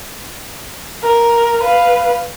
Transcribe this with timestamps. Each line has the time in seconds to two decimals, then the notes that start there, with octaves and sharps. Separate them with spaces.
1.03 A#4
1.63 B4 F5